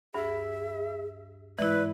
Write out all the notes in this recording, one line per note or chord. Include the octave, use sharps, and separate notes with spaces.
D2 G2 G#4 E5
G#2 E3 E4 B4 D5